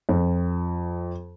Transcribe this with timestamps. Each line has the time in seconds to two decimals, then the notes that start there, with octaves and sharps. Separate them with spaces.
0.09 F2